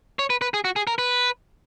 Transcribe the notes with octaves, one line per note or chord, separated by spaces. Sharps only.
C#5
B4
B4
G#4
F#4
G#4
A#4
B4